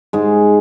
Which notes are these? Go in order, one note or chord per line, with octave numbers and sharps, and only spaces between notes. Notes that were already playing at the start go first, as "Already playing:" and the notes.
G#2 G#3